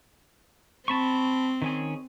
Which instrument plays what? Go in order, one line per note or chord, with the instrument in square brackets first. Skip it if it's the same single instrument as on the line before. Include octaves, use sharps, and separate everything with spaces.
[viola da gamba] C4 [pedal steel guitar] A5 B5 C#6
[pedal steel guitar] D#3 C#4 G#4